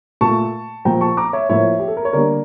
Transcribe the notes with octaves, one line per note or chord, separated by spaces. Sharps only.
A#2 A3 A5 C#6
A#2 F3 A#3 G5 A#5
A5 C#6
A#5 D6
C#5 E5
A2 F3 A#3 C#5 E5
G4
A4
A#4
C#5
D3 G3 A#3 A#4 D5